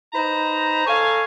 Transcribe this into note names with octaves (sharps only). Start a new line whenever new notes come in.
D#4 B4 C5 A#5
A4 C#5 F5 G#5